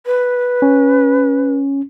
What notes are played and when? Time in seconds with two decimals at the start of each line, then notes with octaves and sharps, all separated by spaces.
0.06 B4
0.62 C#4